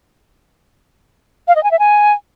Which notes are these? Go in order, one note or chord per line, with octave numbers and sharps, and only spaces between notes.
F5
D#5
G#5
E5
G#5